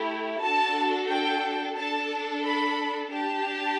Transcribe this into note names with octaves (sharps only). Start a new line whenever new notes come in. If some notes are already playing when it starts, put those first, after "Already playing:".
Already playing: A3 E4 G4
D4 F#4 A4 A5
G5
D4 A4 A5
B5
D4 G4 A5